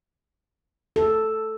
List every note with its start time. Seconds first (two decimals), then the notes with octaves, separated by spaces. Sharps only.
0.96 A4